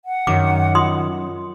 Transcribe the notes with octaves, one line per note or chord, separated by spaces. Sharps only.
F#5
F#2 D#3 D6
F4 C6 D#6